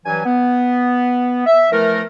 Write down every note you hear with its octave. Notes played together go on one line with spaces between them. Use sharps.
G2 E3 F#3 G#5
B3
E5
E3 F3 A3 A#4